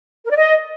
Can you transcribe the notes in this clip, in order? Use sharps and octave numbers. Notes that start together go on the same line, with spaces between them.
A#4
D5
D#5